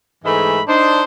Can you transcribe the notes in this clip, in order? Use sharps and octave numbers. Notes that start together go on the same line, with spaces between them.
G#2 E3 G#3 A3 E5 B5
D4 D#4 C5